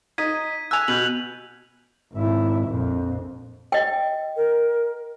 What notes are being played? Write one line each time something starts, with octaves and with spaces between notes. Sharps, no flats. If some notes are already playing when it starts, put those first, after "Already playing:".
D#4 G#6 B6 D#7
G#5 E6 F#6 F7
B2 G6 D#7 F#7
G#1 E4
A#1 F2
D#5 G5
A#4